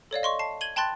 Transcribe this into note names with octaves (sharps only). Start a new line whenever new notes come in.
A4 C#5 D5 F5
D#5 C6 C#6
A5 C7
G#6 D#7 F#7 G7
G5 A5 B5 C6 F#6 A6